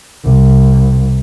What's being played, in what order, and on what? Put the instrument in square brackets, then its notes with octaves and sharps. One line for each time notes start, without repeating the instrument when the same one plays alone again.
[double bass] C2